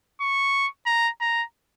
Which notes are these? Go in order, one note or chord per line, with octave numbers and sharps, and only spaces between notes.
C#6
A#5
A#5